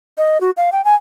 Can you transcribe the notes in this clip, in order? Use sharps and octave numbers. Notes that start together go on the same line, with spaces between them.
D#5
F#4
F5
G5
G#5